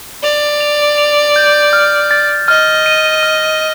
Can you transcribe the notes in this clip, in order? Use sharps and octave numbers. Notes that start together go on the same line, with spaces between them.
D5 F7
F7
F7
G6
F6
A6
D#5 F6
D#7
F6